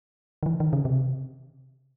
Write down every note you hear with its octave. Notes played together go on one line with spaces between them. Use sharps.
D#3
E3
D#3
C#3
C3